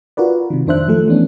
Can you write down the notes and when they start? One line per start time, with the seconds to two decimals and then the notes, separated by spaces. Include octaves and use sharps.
0.17 F4 F#4 A#4 B4 D5
0.50 C3 D#3
0.67 F2 D#3 D4 C5 E5 F#6
0.88 D#3 F3 A3 A4
1.08 E3 B3 C#4 D4